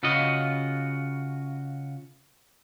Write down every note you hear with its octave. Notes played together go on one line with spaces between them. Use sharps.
C#3 F4 F#4 D#5